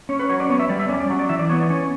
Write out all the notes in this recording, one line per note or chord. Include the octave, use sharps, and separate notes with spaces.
C#4 C#5
B4
F#3 C#5
D5
B3 C#5
E5
G3 D5
E5
C#4 D5
D5
F#3
D5
E3 E5
D5
B3 C#5
D5
C#4 C#5